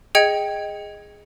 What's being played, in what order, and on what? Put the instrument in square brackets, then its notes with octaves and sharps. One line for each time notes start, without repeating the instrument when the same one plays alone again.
[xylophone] G#4 D#5 G5 G#6 C#7